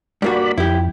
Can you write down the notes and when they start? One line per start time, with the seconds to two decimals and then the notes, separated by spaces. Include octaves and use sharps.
0.22 G2 A#3 F#4 D5 B5
0.58 F2 E4 G4